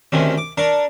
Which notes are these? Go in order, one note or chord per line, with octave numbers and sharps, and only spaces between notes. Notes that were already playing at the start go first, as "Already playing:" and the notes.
D2 C3 D#3 C#4
D6
D4 A#4 C#6 D6